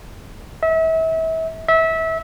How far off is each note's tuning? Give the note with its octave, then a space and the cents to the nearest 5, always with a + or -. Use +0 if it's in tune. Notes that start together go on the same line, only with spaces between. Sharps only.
E5 -35
E5 -25